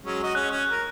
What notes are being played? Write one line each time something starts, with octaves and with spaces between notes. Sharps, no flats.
F#3 G#3 C#4
F#4 D#5
G#3 C#4 F#6
C#4
A#4